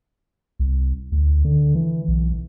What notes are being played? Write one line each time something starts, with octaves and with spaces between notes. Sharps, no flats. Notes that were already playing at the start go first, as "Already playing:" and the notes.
C2
D2
D3
E3
B1